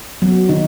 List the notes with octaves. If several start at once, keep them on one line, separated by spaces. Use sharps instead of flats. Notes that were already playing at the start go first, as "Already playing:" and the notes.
F#3 B3 F#4
D#3 F#3 D#4